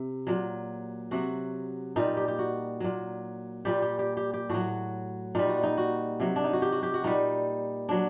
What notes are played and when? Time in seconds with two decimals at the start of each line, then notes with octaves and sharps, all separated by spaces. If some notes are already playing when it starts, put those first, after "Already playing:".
Already playing: C3
0.27 A#2 F#3
1.11 C3 F#3 F#4
1.96 A#2 G3 D#4
2.17 G4
2.28 G4
2.39 F#4
2.80 A#2 F#3
3.65 A#2 G3 G4
3.82 G4
3.99 G4
4.17 G4
4.34 G4
4.50 A2 F#3 F#4
5.35 A#2 G3 D#4
5.49 F#4
5.63 D#4
5.77 F#4
6.20 C3 F#3
6.36 D4
6.44 D#4
6.53 F#4
6.62 G4
6.72 F#4
6.83 G4
6.94 F#4
7.04 A#2 G3 D#4
7.89 F#3 D4